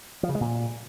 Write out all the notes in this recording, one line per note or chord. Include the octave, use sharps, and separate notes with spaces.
F3
C#3
G#3
A#2